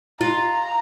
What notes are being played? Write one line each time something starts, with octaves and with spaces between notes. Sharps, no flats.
F4 A#5